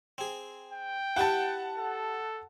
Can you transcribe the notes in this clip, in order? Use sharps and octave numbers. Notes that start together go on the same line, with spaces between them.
C4 G#4
G5
E4 G4 B4 F#5 A5
A4